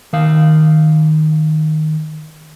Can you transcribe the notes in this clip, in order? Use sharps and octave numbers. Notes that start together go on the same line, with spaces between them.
D#3 F5